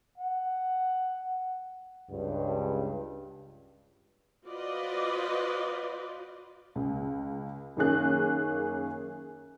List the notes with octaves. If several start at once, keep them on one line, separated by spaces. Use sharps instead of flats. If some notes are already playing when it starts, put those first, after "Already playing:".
F#5
C#2 G2
F4 F#4 B4 C5 D5 D#5
C#2
F#2 D#3 A#3 C#4 G#4 F#6